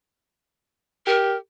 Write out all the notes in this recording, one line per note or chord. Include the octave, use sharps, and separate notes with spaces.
G4 A#4